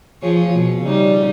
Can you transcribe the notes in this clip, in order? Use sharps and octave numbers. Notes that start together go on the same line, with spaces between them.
F3 G#4 C#5
B2
C#3 G3 D#4